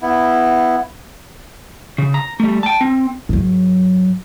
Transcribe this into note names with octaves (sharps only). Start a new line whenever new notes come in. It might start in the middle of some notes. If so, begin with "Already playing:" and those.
B3 E4
C#3
A#5
G3 A3
G5 A5
C4
G#2 F#3